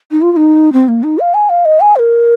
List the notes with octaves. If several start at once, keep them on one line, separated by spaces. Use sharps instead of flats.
D#4
F4
F4
D#4
C4
A#3
D#4
F5
G#5
F5
D#5
G#5
C5
A#4